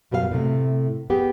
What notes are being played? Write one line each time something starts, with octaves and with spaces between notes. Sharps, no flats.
F#2 B2 G3 A#4 F5
A2 C3 A3
B3 G4 G#4 G5